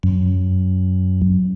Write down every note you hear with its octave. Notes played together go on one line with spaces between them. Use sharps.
F#2